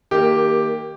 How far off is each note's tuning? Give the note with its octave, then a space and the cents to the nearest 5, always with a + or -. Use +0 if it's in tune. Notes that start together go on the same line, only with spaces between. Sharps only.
D#3 +10 A#3 -10 G4 +0